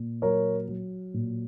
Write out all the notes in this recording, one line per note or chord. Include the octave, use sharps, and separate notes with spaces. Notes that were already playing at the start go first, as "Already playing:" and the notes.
Already playing: A#2
F#3 A#4 C#5
F#3
A#2